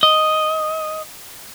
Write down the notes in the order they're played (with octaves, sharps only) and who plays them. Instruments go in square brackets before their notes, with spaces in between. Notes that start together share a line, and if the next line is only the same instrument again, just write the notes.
[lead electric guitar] D#5